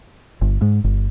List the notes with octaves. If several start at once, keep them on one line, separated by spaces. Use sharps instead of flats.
G1
G#2
G1